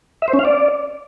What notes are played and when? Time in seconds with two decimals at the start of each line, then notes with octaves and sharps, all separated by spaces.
0.22 E5
0.28 C5
0.33 C#4
0.39 F5
0.45 D5